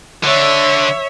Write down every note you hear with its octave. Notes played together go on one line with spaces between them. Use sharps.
D3 C#5 E5